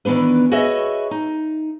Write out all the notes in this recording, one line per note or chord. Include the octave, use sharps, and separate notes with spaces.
D#3 E3 B3 D4 B4
F#4 G#4 B4 C#5 D#5 E5
D#4